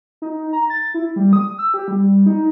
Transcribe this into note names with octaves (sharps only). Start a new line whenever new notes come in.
D#4
A#5
A6
E4
G3
D#6
E6
G4
G3
D#4